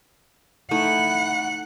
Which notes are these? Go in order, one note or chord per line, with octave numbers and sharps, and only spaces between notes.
A3 D#4 E4 F#5